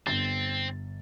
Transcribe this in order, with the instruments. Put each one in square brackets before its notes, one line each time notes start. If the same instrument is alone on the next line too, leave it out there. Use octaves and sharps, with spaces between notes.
[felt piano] G1 A6 [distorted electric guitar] C4